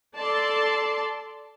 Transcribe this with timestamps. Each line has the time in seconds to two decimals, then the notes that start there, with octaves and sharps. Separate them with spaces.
0.18 A4 D5 A5 C6